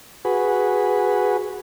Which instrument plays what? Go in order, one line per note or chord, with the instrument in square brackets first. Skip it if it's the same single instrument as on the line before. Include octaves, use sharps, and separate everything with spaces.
[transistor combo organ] F#4 G#4 B4